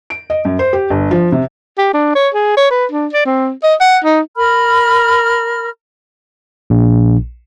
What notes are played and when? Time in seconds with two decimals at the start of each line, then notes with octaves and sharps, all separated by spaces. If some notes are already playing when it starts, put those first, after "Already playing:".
0.10 D7
0.30 D#5
0.45 F#2
0.59 C5
0.73 G4
0.90 G1
1.11 F3
1.32 C3
1.78 G4
1.94 D4
2.15 C#5
2.34 G#4
2.57 C#5
2.71 B4
2.91 D4
3.13 D5
3.26 C4
3.63 D#5
3.81 F#5
4.04 D#4
4.36 A#4 B5 F6
6.70 A#1